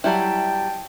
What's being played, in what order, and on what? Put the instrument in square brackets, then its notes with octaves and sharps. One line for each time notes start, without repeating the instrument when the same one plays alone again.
[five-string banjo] F#3 G3 E4 [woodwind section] G5 A5